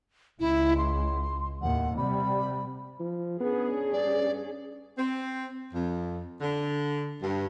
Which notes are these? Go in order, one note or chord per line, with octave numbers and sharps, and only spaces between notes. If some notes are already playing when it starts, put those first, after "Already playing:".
C#2 E4
C6
D#2 A2 F#5
C3 G3 B5
F3
B3 C#4 D4 G#4
G2 D5
C4
F2
D3
G2